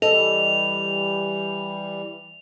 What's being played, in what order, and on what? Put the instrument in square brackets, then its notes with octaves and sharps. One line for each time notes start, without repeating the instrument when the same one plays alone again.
[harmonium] E3 G3 [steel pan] A4 [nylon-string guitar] D#5 [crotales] F7